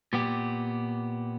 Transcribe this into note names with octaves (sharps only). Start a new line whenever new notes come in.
A#2 B3 G4